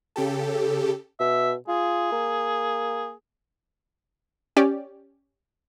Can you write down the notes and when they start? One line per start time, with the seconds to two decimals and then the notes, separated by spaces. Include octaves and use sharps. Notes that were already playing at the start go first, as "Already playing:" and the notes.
0.16 C#3 G4 A4
1.20 B2 E5
1.68 F4 G#4
2.12 A#3
4.57 C#4 G4 D5